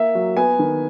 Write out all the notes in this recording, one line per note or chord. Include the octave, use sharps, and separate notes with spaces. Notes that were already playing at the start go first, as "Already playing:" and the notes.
Already playing: A#3 E5
F#3
B3 G#5
D#3